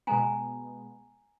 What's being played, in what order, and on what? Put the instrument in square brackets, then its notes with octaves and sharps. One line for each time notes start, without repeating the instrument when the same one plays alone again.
[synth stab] B2 G#3 B3 [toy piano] G#5 A#5